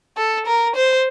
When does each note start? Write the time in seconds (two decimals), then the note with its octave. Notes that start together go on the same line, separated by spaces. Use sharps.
0.17 A4
0.47 A#4
0.76 C5